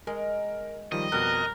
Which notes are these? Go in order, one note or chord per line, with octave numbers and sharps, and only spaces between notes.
G#3 A#4
D#3 F3 G3 D#5
F2 B2 G3 A#4 F#6